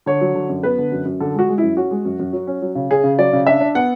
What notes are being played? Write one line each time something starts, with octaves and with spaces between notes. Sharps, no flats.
D3 C#5
F#3
D3
F#2
B3 B4
D3
F#2
F#2
D3 A4
G#3 F#4
G#3
F#2 E4
C#4 F#4
G#3
F#2
F#2
F#3
C#4
F#3
C#3
C#4 G#4
C#3
F#3 D5
C#3
D4 E5
D4
B3 F#5